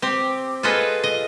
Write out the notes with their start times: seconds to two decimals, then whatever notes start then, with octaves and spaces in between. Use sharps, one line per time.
0.02 C4 G4
0.63 F4 G#4 A4 B4 D#5
1.04 D#5